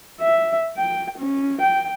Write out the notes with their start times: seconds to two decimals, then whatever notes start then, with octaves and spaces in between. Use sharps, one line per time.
0.20 E5
0.77 G5
1.19 C#4
1.61 G5